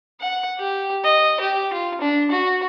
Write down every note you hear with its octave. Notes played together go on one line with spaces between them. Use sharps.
F#5
G4
D#5
G4
F4
D4
F#4